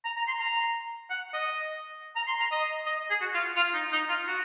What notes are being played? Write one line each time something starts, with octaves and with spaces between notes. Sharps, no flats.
A#5
A#5
C6
A#5
F#5
D#5
A#5
C6
A#5
D#5
D#5
G#4
F#4
F4
F4
D#4
D#4
F4
F#4